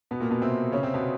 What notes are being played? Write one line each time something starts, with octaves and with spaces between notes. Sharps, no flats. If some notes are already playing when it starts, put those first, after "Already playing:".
B2 B3
A#2 A#3
B2 B3
C3 C4
C#3 C#4
C3 C4
B2 B3